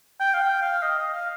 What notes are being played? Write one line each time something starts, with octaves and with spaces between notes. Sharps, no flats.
G5
F5
G5
F5
D#5
D#5
F5